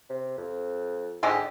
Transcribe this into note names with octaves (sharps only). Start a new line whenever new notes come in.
C3
F2
G#2 D3 G#3 G4